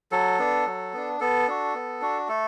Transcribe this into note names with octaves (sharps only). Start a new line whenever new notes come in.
F#3 A4
B3 D4
F#3
B3 D4
B3 A4
D4 F#4
B3
D4 F#4
A3 A4